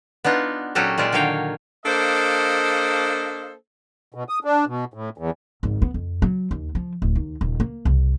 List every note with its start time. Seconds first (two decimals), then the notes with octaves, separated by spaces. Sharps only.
0.24 B3 D4 D#4 F4
0.75 A#2 F#3 C#4 F#4 G4 A4
0.98 A#2 G#3 F4 D5 E5
1.12 D3 D#3 F#3 C#5 F5 G5
1.86 A#3 D4 A4 C5 D#5 F5
4.14 B2
4.29 D#6
4.44 D4
4.67 B2
4.94 A2
5.18 E2
5.63 G#1
5.82 B3
5.94 F2
6.22 F#3
6.51 D#2
6.75 F3
7.02 D1
7.15 D#2
7.41 D#1
7.60 A#3
7.85 C2